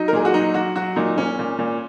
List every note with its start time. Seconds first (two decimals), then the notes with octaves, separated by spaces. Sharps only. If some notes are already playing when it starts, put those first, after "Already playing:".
Already playing: F#3 D#4
0.08 A#4
0.13 A#2 G#4
0.25 F#4
0.34 F#3 D#4
0.54 F#3 F#4
0.76 F#3 F#4
0.96 A#2 D#4
1.17 A#2 C#4
1.39 A#2
1.59 A#2